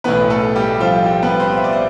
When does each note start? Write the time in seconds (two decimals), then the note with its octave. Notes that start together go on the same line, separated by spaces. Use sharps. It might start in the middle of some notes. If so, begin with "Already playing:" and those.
0.04 B1 A2 E3 B3 B4
0.30 A3 A4
0.55 G3 G4
0.80 F3 F4
1.06 G3 G4
1.23 B3 B4
1.40 C4 C5
1.57 E5
1.64 D5
1.72 C5